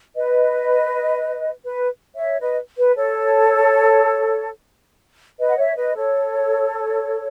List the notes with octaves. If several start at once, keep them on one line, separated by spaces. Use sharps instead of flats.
B4 D#5
B4
C#5 E5
B4 D#5
B4
A4 C#5
B4 D#5
F#5
C#5 E5
B4 D#5
A4 C#5